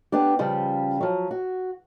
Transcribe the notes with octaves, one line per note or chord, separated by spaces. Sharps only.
B3 D4 G4
C#3 F3 G3
F3 F#3
F#4